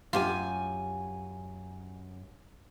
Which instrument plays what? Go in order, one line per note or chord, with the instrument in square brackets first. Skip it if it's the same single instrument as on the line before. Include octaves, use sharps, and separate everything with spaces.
[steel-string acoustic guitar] F#2 G#5 [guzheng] F4 G4